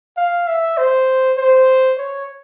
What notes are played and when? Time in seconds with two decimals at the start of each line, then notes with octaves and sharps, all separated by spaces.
0.17 F5
0.48 E5
0.78 C5
1.38 C5
1.98 C#5